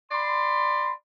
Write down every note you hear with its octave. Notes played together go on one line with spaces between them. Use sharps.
D5 B5 C6